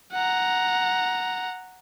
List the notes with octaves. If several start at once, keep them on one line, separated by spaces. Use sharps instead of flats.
F#5 A#5